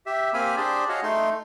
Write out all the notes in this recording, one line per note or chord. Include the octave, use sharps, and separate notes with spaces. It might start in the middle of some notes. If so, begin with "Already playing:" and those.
G4 E5
A#3 C4 G4 F5 G#5 B5
D4 G4 G#4 C5 D5
F#4 G#4 C#5 D#5 F5
A3 D#4 C6